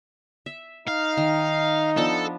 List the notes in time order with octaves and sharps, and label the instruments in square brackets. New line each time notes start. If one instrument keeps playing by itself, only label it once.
[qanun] E5
[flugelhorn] D#4 [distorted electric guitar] F5
[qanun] D#3
[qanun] F3 B3 D4 [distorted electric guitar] A4